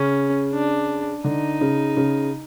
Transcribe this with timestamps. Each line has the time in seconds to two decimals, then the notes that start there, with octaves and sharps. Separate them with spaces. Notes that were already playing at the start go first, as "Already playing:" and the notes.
Already playing: C#3 C#4
0.53 D4
1.24 D3 D#4
1.61 C#3
1.97 C#3